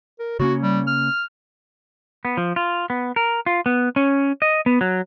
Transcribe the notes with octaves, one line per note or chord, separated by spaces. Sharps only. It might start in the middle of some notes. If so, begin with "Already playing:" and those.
A#4
C#3 A#3 C#4 F#4
G3
F6
B3
F3
F4
B3
A#4
F4
B3
C#4
D#5
B3
F#3